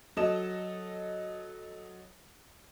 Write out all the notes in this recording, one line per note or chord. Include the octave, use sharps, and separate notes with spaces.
F#3 A4 D#5 E7